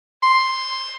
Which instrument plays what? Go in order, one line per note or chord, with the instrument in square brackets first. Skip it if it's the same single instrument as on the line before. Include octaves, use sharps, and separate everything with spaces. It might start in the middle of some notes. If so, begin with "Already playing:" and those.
[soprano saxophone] C6